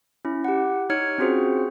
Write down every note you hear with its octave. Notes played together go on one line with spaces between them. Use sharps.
C#4 E4
G4 F#5
D#4 C#5 F6 G#6 C#7
C4 C#4 F4 F#4 G#4 C5